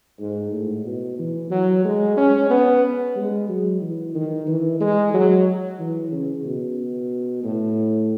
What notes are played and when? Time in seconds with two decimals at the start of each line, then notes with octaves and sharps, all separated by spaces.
0.20 G#2
0.52 A2
0.85 B2
1.19 E3
1.51 F#3
1.85 G#3
2.17 C#4
2.50 B3
3.16 G#3
3.49 F#3
3.82 E3
4.15 D#3
4.47 E3
4.81 G#3
5.14 F#3
5.79 E3
6.12 C#3
6.45 B2
7.44 A2